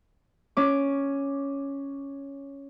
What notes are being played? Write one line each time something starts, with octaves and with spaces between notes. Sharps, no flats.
C#4 D6